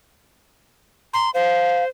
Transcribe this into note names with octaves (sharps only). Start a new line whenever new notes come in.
A#5 C6
C5 F5